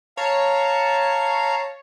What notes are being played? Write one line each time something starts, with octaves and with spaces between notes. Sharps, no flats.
C#5 F5 A5 A#5